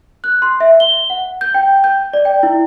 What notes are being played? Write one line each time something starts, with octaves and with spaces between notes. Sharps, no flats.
F#6
C6
E5
G7
F#5
G6
G5
G6
D5
G5
E4